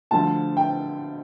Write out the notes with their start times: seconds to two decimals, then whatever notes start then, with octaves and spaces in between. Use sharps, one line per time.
0.11 D2 D3 F3 A5
0.57 G5